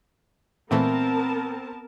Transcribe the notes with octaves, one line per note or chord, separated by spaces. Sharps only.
A#2 E3 A3 B3 C4 A#4 A5